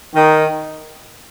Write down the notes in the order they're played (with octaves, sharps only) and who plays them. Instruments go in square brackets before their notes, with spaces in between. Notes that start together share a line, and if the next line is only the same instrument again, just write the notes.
[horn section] D#3